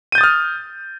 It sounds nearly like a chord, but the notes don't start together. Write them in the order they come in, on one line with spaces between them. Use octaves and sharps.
D#7 G6 A6 D#6 F6